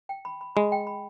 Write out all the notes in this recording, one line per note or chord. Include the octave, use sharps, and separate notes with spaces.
G5
B5
B5
G#3 B5
G5
B5